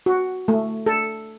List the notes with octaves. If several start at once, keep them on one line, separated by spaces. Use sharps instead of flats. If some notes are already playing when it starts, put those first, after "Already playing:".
F#4
A3
A4